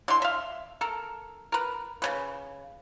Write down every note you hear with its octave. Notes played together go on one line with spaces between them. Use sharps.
D3 E3 C6
E5 F5
A4 A#4
A#4 B4
C#3 C#4 B4